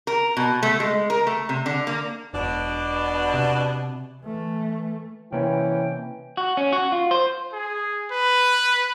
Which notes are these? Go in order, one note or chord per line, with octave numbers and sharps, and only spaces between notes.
A#4
B2
A3
G#3
A#4
A3
C3
D3
A#3
E1 B2 D4
C3
E3 A3
C3 E3 A#3 C#4 G5
F#4
C#4
F#4
F4
C5
G#4
B4